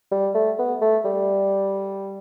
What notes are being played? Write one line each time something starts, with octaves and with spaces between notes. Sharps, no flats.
G3
A3
B3
A3
G3